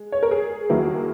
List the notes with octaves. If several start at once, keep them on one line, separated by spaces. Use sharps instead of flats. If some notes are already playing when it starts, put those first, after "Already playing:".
Already playing: G#3
C#5
A#4
G#4
D#2 D#3 F#3 A#3 E4